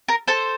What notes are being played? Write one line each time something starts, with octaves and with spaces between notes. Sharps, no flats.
A#4
A4 C5